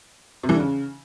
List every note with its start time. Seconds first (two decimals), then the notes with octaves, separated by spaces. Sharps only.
0.43 C3
0.49 E3
0.54 D3
0.60 C#3